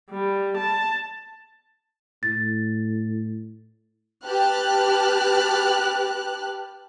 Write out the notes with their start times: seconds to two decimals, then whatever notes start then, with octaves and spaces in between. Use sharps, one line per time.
0.11 G3
0.57 A5
2.23 A2 A6
4.25 G4 B4 A5 F6 F#6